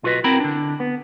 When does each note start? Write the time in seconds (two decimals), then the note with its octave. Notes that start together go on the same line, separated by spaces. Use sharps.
0.03 B1 F4 F#4 B4 D#5
0.24 C4 E4 F#4 A#4 G5 B5
0.40 D3 D4
0.80 B3